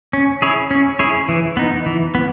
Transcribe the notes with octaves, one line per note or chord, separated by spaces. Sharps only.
C#4
E4 G#4 C#5
C#4
E4 G#4 C#5
E3
B3 D#4
E3
B3